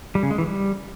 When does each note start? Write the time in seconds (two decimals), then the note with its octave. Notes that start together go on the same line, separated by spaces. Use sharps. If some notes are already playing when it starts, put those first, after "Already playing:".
0.15 G3
0.23 C#3
0.31 G#3
0.38 E3
0.46 G3